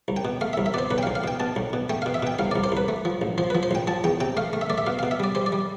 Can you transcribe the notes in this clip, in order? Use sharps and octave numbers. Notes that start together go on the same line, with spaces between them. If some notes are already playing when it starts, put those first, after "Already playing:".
C2
G5
B2
A3 F5
E5
C2
E5
B2 C5 D5
B1 B4
G5
F5
B1
F5
B2 G5
B2 A5
B1
B2
A3 G5
F5
B2
E5
B2 G5
C2 F5
D5
C2
C5
C2 B4
A3
F3
A1
F3 C5
B4
F3
C5
A1 G5
F3 A5
E2 G5
C3 G5
A3 F5
A3
E5
A3 D5
E5
B2 F5
F5
B2
E5
G3 D5
G3 C5
D5
G3